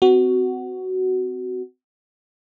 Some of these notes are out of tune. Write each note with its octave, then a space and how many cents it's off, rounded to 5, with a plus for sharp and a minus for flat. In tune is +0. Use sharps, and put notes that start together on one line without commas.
C4 -35 F#4 +10